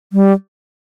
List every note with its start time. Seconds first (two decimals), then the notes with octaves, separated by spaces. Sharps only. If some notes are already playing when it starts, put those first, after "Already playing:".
0.13 G3